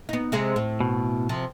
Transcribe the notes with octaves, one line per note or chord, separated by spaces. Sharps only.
B3 D#4
C3 G#3 G#4
A2
B2
C3 F3